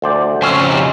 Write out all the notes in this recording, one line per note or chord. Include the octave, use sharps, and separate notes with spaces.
D2 C5 D5
F2 C#3 C4 C#4 C5
D#4 G4